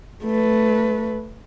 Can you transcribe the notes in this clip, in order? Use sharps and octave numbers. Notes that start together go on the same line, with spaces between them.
A3 B4